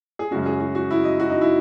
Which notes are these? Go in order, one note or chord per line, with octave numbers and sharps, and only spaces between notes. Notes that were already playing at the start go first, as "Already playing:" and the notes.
G#4
F#2 C#3 G#3 C#4 F#4
G#4
F#4
F#4
E4
D#5
F#4
D#4
E4